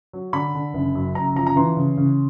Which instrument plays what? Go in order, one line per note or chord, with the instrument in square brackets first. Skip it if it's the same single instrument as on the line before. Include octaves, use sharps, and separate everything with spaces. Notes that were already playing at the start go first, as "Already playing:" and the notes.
[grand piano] F#3
D3 B5
D3
F#1
F#2
F#1 A#5
F3 A#5
A#5
E3 C6
C#3
C#3